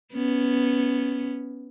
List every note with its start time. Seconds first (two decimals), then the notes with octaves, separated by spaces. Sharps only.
0.13 B3 C#4